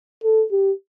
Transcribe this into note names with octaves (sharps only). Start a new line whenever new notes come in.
A4
G4